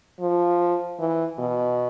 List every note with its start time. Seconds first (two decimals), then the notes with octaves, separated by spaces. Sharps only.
0.20 F3
0.99 E3
1.39 B2